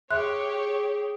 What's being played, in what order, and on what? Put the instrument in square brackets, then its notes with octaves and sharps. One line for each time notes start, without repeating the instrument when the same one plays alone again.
[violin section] G4 C#5 [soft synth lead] G#4 [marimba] E5 C6 F#6